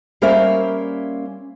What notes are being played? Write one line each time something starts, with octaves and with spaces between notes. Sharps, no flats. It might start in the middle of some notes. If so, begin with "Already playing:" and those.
G3 A#3 C#4 A#4 C5 E5